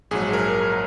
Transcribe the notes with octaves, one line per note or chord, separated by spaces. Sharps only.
A#1 G#2 F#3 G#4
A#4